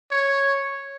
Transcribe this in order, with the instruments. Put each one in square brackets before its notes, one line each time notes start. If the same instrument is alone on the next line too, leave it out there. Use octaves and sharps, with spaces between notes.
[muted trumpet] C#5